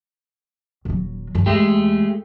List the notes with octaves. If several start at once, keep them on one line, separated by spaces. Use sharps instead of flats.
D#1 F#3
E2 G2
E2 G#3 A3 G4